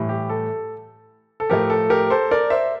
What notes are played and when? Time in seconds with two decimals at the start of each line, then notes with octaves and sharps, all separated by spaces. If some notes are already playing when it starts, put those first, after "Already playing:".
Already playing: A2 E3 G3
0.09 G4
0.29 A4
1.40 A4
1.50 A2 F3 A3 G4 A#4
1.70 A4
1.90 G4 A#4
2.10 A4 C5
2.31 A#4 D5
2.50 C5 E5